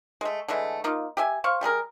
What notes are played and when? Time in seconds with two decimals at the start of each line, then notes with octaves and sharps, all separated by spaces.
0.21 G#3 A3
0.48 D3 E3 G#3 A3
0.84 A#3 D#4 F4
1.17 G4 E5 G#5
1.44 C5 F5 C#6
1.61 G3 A3 G#4 A#4